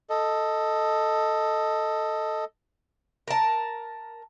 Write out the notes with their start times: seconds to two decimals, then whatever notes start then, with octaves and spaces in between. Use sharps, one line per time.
0.10 A4 D#5
3.28 A#4 A5